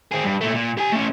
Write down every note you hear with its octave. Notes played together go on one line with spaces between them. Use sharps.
C4 G#4
G2
A#2 A3
A#2
G4 G#5
A3 C#4